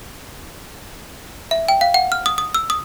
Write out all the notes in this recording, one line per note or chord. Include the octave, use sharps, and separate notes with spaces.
E5
G5
F5
F#5
F6
D#6
D#6
E6
D#6